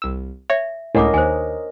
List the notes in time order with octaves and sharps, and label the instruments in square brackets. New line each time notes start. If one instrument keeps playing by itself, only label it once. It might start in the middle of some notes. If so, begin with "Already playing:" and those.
[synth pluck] C2 E6
[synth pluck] C#5 [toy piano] E5
[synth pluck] C#2 A2 [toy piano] D4 F#5 D6 [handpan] A#4 C#5 D#5
[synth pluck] D#2 [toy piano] C5 G#5